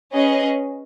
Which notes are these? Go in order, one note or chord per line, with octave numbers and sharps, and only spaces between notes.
C#4 G#4 B4 D#5